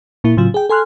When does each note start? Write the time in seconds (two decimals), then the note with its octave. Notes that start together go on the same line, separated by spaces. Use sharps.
0.24 A#2 A#3 E4
0.37 A2 C#3 F#3 F4
0.54 G#4 G5
0.69 A4 G#5 C6 F6 F#6